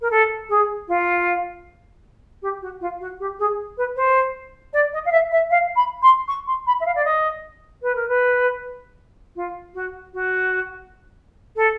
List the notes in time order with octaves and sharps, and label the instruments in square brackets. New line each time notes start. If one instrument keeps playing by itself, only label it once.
[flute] A#4
A4
G#4
F4
G4
F#4
F4
F#4
G4
G#4
B4
C5
D5
D#5
F5
E5
E5
F5
B5
C6
C#6
C6
B5
E5
F5
D5
D#5
B4
A#4
B4
F4
F#4
F#4
A4